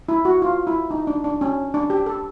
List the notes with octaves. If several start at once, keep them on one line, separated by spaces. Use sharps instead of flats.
E4
F#4
F4
E4
D#4
D4
D4
C#4
D4
G4
A4